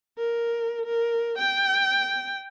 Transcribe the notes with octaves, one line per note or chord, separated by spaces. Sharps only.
A#4
A#4
G5